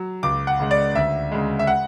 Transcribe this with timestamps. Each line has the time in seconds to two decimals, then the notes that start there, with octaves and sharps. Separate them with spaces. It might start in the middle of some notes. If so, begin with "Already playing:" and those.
Already playing: F#3
0.23 C#2 D6
0.47 F#5
0.60 C#3 G#3
0.71 D5
0.95 D2 E5
1.32 C#3 G#3
1.59 E5
1.67 F#5